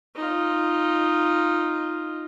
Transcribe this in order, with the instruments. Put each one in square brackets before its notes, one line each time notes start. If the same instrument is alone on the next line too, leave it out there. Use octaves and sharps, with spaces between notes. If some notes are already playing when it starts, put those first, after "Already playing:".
[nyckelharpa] D#4 F4